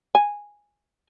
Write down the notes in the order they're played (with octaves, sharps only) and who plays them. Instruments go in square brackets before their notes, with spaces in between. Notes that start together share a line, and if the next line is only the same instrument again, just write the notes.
[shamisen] G#5